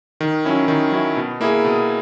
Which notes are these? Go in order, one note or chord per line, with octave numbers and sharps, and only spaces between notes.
D#3
F#3 C#4 E4
D#3
F#3 C#4 E4
B2
A#3 E4 G#4
B2